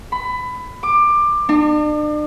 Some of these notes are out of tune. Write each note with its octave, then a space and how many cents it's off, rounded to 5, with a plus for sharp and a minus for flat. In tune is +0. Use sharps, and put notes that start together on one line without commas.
B5 +20
D6 +20
D4 +40